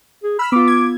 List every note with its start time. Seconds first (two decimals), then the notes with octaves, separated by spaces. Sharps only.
0.23 G#4
0.39 B5 E6 F6 B6
0.52 B3 F4 D6
0.68 G#6